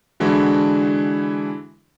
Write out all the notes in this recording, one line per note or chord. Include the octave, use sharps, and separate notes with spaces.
D3 E3 G#3 D4 E4 F#4